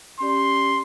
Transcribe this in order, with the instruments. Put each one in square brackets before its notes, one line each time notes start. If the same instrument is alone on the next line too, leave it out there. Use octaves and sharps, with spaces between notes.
[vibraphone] C#4 G4 D5 [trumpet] C6